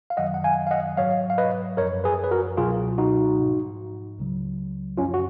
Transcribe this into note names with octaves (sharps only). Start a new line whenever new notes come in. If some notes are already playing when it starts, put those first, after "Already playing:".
F5
F#2 D#3 F#3 D#5 F#5
F#5
F5 G#5
F5
D#5 F#5
G#2 F#3 C#5 F5
F5
B4 D#5
F#2 F3 A#4 C#5
G#4 B4
B4
F#4 A#4
C#2 B2 F#3 F4 G#4
D#4 F#4
G#2 F3
C#2 C#3 F#3
F#2 F3 C#4 F4
F#4